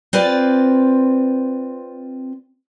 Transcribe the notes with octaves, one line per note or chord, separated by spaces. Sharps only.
C4 F4 B4 D5